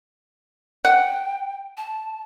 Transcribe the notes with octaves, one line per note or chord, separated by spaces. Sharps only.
F#5 G5
A5